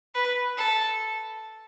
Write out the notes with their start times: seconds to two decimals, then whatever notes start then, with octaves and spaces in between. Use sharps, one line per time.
0.15 B4
0.57 A4